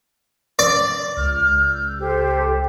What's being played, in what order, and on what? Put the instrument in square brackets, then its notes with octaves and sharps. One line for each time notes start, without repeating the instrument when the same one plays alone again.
[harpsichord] D5
[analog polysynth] C#2 [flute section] F6
[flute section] E6 G6
G4 A4 C5